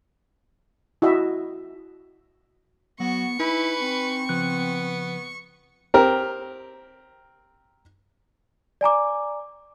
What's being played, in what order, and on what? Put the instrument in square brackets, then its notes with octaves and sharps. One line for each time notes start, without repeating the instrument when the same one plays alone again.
[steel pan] E4 F#4 D#5 E5
[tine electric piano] F#3 [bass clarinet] B3 [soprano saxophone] F#4 [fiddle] C#6
[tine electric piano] D#4 G#5 B5 [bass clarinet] E4 [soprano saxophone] B4
[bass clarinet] C4
[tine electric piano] C#3 F3 F#6 [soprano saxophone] B3
[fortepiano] C4 G4 A#4
[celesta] D5 G#5 A#5 D6